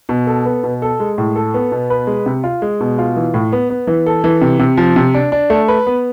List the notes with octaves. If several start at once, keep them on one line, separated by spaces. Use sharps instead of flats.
B2
A4
B3
B2
A4
G#3
A2
A4
B3
B2
B4
G#3
C3
F4
G#3
B2
F4
E3
A2
B3
B3
E3
A4
E3
C3
C3
F3
C3
D4
D4
A3
B4
B3